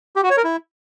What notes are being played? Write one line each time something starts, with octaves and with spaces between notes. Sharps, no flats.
G4
F#4
C#5
A#4
E4